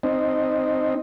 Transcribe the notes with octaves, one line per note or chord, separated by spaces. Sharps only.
C4 D#4